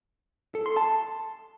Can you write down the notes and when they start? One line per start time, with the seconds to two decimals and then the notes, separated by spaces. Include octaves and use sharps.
0.55 A4
0.66 C6
0.77 A5